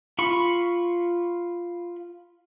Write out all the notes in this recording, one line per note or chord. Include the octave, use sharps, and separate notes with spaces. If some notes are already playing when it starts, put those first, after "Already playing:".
F4 B5 C#6